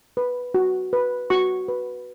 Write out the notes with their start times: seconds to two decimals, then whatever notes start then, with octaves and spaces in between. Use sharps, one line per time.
0.17 B4
0.54 F#4
0.93 B4
1.30 F#4 C#6
1.68 B4